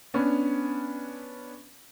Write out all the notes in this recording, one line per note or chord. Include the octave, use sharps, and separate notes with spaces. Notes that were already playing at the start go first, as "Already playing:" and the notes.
B3 C#4 D4